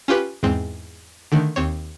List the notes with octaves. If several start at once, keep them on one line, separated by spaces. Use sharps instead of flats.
C#4 F4 G4 B4
E2 G#2 G#3 C4
D3 D#3 A3
D#2 C4 C#5